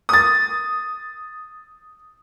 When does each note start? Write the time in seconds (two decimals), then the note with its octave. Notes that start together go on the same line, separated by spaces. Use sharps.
0.09 D#6 A6